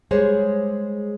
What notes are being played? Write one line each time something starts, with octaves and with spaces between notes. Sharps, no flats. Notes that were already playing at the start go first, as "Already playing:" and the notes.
G3 G#3 G#4 C5 C#5